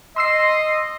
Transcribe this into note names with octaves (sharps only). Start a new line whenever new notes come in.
D#5 C6 E6 C7